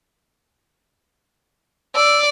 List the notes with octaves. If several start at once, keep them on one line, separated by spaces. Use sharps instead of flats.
D5 E6